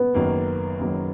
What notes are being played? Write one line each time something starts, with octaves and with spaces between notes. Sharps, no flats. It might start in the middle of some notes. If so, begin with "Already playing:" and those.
Already playing: B3
F#1 F#2 D#3 F#3 A#3
F#1 F#2 D#3 F#3 A#3